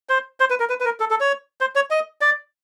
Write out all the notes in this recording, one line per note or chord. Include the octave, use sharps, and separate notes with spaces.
C5
C5
B4
A#4
B4
B4
A#4
A4
A4
C#5
C5
C#5
D#5
D5